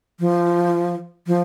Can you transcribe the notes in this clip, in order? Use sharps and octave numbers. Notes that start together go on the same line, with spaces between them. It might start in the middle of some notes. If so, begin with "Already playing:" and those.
F3
F3